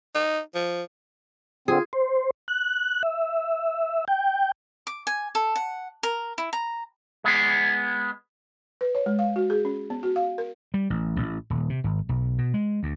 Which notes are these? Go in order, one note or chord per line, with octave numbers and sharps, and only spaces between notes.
D#4
F3
D3 C4 F4 G#4
C5
F#6
E5
G5
D6
G#5
A4
F#5
A#4
E4
A#5
G#3 B3 G#4
B4
C#5
G#3
F5
F#4
G#4
C#4
B3
F#4
F5
A#4
G3
A1
A1
D#1
C3
G#1
B1
B2
G#3
D2